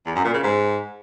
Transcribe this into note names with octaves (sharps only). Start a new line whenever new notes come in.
E2
F#2
A#2
C#3
G#2